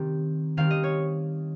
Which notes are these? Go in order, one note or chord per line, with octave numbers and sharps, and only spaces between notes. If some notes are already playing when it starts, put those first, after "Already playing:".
Already playing: D#3 G3 C4
D#3 G3 C4 F5
D#5
C#5